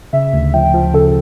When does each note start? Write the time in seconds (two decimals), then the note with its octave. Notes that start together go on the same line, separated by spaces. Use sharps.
0.13 C#3 E5
0.33 D2
0.54 F3 G5
0.74 F3
0.94 C#3 A4